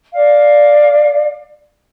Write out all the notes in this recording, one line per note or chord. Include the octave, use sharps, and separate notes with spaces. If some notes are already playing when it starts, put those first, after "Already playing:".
D5 F5